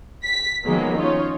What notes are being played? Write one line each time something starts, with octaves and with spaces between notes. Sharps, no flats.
B6
D#3 F3 F#3 G#3 A#3 B3
C#4 D#4 F4 C#5